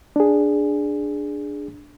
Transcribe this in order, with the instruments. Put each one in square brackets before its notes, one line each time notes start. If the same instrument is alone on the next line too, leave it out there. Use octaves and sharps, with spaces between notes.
[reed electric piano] D4 G#4